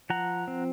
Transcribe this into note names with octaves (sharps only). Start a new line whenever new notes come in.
F3 F#5 A#5
C4